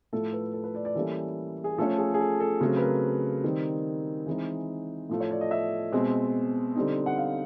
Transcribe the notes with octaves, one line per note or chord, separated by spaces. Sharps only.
A2 F3 A3 A4
B4
A4
B4
D5
D5
E3 G3 A#3 C#4 A4
G#4
F3 A3 C#4 A4
G#4
G#4
A4
A4
C#3 F#3 A3 C4
B4
A#4
D#3 G3 C4 D#4
E3 G#3 C4 D#4
A2 F3 A3
C#5
D5
D#5
E5
B2 G#3 C4
D3 G3 C4 D#4
F#5
F5